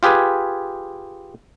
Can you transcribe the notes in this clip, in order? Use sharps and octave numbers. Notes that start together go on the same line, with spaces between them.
F4 G4 G#4 B4 G#5